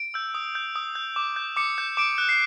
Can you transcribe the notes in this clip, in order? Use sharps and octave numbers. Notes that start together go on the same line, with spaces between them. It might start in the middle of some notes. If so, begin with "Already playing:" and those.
Already playing: D7
E6 G6
D#6
G6
D#6
G6
D6
G6
D6 C#7
G6
D6 D7
F#6
C7